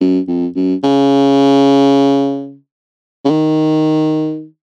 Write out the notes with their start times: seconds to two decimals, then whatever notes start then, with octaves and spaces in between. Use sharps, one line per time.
0.01 F#2
0.28 F2
0.55 F#2
0.83 C#3
3.24 C#3
3.30 D#3